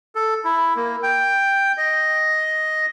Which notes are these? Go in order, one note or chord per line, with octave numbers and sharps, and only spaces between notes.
A4
E4
A#3
G5
D#5